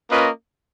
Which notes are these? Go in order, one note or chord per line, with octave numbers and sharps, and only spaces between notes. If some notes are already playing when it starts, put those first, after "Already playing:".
A#3 C#4 F4 B4 D#5